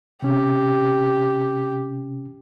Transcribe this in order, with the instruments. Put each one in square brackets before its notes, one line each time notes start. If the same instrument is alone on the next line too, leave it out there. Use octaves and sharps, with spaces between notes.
[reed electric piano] C3 C#4 [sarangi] G4